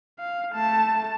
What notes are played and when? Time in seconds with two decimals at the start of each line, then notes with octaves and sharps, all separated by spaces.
0.19 F5
0.53 A3 A5